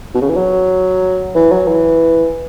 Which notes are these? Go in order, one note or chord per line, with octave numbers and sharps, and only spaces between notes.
B2
C#3
E3
F#3
E3
F#3
E3